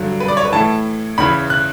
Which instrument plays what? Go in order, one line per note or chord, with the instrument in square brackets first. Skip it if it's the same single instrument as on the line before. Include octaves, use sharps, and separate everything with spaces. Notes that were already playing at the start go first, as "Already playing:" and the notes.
Already playing: [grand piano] G2 D3 F#3
B4
D5
C#5
B4
A2 E3 A5
E2 C#3 E3 B5
F#6